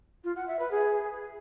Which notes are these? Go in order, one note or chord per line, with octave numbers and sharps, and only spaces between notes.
F4
F#5
E5
B4
G#4